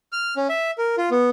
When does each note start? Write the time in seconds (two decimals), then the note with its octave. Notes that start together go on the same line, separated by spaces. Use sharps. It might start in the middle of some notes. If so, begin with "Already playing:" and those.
0.12 F6
0.37 C#4
0.49 E5
0.78 A#4
0.98 F4
1.11 B3